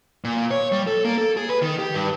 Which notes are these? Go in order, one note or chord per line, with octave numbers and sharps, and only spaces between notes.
A#2
C#5
G3
A4
A#3
A4
G#4
B4
D#3
G4
G2